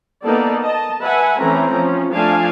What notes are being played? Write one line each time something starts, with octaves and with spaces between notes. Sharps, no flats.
A#3 B3 D#4 A4 D5
D#5 A5
B4 E5 F#5 G#5
E3 A3 C4 C#4 A#5
F3 C#4
F3 A3 D4 F5 G#5 A5